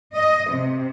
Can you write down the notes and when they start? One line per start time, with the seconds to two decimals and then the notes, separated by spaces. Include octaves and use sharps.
0.14 D#5
0.50 C3